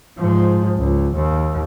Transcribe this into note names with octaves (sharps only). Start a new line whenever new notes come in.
G#2 F3
C#2
D#2